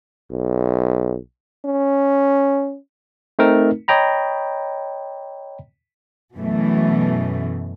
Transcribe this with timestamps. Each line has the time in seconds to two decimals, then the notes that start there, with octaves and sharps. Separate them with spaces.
0.31 B1
1.65 C#4
3.39 A3 C4 D#4 A#4
3.88 C#5 D#5 G5 A#5 B5
6.37 F#2 B2 E3 A3